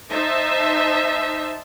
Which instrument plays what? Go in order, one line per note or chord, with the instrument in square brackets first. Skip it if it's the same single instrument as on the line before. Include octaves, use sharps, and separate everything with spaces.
[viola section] D#4 C5 E5 A5